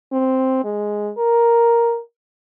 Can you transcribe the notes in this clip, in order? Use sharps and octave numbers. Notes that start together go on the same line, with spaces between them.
C4
G#3
A#4